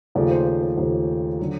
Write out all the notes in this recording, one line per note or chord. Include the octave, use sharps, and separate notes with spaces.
D#2 C#3 F3 A3 D5
C5
C5
C5
D#2 C#3 F3 A3
D3 F#3